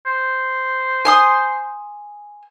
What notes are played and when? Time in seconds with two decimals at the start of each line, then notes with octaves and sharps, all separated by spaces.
0.06 C5
1.05 G#5 C6 D#6